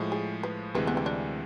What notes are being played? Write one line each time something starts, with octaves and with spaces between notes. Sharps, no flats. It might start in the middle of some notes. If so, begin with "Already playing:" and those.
Already playing: A2 F3 G#3
G#4
B4
D2 C3 E3 G#3 B4
B3
C4
D4